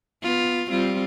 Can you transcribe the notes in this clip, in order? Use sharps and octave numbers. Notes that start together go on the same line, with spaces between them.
B3 F4
G3 C4 F4